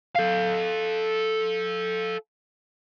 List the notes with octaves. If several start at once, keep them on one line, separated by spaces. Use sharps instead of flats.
A4 F5